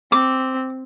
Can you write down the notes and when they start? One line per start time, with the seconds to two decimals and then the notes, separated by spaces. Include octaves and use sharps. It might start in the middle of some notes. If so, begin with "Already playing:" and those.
0.12 C4 D6